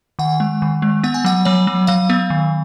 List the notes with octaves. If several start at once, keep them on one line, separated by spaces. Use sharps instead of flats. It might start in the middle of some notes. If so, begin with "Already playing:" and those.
D#3 F#5
G#3
D#3
G#3
B3 F#5
G#5
F#3 F#5
F#3 C#5
F#3
F#3 F5
B3
D#3